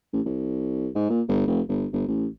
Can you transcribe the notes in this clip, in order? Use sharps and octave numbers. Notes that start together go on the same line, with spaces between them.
A1
C2
G#2
A#2
G1
F1
G1
G1
A1